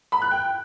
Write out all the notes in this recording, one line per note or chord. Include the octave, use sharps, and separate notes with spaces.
B5
F#6
G5